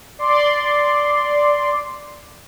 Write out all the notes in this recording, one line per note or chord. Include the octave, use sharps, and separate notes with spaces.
D5 C6